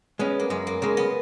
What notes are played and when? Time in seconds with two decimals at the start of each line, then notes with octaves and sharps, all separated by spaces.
0.19 G#3 B3 C#4
0.40 A#3
0.50 F#2 G#3
0.67 A#3
0.82 C#3 G#3 A#3
0.97 B3